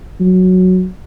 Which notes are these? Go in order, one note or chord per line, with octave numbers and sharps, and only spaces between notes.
F#3